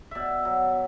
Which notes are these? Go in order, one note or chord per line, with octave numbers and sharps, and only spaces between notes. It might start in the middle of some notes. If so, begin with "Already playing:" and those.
B2 D5 E5
F#3